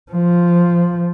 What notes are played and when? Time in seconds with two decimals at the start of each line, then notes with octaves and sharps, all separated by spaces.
0.12 F3